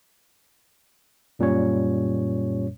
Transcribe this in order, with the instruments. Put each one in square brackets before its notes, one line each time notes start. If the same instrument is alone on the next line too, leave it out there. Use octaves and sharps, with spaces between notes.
[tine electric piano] F#2 A#2 G3 C#4 C#5